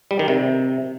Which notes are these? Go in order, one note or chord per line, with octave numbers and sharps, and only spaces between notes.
G3
D#3
C3